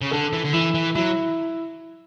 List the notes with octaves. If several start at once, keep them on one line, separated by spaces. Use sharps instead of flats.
C#3
D3 A4
E3
D3
E3 E4
E3
F#3 E4